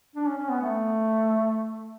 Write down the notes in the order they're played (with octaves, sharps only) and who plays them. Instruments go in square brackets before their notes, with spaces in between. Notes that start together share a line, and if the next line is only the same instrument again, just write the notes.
[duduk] D4
C#4
C#4
B3
A3